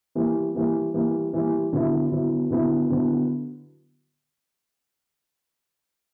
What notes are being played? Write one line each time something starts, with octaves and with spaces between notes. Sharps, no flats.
E3 G3 A#3
E3 G3 A#3
E3 G3 A#3
E3 G3 A#3
D3 F#3 B3 E4
D3 F#3 B3 E4
D3 F#3 B3 E4
D3 F#3 B3 E4